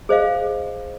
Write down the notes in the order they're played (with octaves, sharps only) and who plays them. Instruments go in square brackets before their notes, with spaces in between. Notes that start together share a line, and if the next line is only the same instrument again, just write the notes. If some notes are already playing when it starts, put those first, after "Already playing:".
[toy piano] G#4 C5 D#5 F5